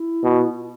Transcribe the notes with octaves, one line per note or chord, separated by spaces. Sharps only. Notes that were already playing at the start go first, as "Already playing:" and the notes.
Already playing: E4
B2
F4